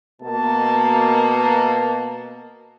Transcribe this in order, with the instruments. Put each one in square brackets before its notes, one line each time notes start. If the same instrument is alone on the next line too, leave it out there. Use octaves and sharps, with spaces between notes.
[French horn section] B2 A#3 [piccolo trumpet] A5